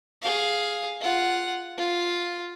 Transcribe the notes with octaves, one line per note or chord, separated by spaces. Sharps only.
G#4 F5
F4 F#5
F4